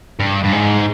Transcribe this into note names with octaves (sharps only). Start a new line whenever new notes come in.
G2
G2
G#2